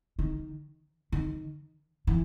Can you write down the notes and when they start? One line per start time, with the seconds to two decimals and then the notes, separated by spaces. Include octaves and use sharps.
0.19 D#3
1.12 D#3
2.07 E3